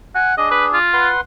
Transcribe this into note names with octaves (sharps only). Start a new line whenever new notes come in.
F#5 G#5
D4 G#4 D#5
B4
F4
B4 F#5 C6